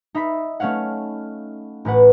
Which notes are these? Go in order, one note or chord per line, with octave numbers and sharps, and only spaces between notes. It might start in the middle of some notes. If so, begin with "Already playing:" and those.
D#4 E5 B5 B6
A3 C#4 C#5 F5 F#5
A1 A2 B4 F#5